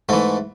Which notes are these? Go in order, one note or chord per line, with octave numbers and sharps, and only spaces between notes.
G#2 E3 A3